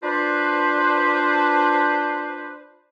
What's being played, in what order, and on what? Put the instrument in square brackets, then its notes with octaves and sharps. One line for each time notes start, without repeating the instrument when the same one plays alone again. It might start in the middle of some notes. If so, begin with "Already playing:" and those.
[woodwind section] D4 F4 B4 C5